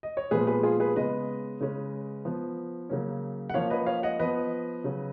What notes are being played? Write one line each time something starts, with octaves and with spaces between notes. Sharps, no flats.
D#5
C#5
A#2 F3 G#3 B3 G#4 B4
G#4 B4
F4 G#4
G#4 B4
C#3 G#3 B3 B4 D#5
C#3 G#3 C#4
F3 B3
C#3 F#3 A#3 C#4
F#5
F3 A#3 C#4 C#5 F5
B4 D#5
C#5 F5
D#5 F#5
F3 B3 B4 D#5
C#3 F#3 C#4